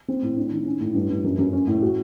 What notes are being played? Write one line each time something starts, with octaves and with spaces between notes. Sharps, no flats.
C4
A2
D4
D#3
C#4
A2
G2
G2
F#2
F#2
C#4
A2
F#4